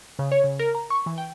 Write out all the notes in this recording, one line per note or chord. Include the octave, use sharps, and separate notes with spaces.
C#3
C#5
C#3
A#4
A#5
C#6
E3
G5